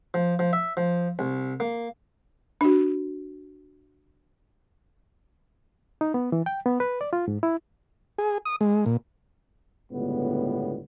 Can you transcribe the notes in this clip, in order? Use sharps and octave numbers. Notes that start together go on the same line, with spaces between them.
F3
F3
E5
F3
C2
A#3
D4 F#4
D#4
B3
E3
G5
B3
B4
D5
F4
G#2
E4
G#4
D#6
G#3
A#2
G1 C#2 A2 D3 B3